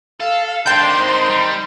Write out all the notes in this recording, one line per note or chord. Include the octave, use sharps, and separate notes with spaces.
A4 F5
D#3 C4 D4 G5 A5 C6 G6
D#4 C5
G3